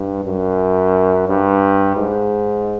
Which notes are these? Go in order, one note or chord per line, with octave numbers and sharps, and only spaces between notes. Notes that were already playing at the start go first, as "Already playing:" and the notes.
Already playing: G2
F#2
G2
G#2